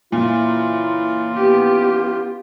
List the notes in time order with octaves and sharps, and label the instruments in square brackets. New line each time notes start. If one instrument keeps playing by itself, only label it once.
[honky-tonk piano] A#2 [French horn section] C#3 E3 E4 [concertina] F4
[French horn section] F3 C#4 E4 [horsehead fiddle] B3 G4